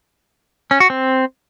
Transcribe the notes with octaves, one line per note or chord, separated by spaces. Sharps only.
C#4
F#4
C4